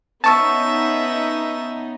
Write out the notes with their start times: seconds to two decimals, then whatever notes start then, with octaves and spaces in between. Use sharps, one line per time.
0.24 B3 C#4 D#4 E5 A5 C#6 E6